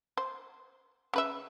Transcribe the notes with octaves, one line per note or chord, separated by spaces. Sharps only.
C5
C#3 B4 E5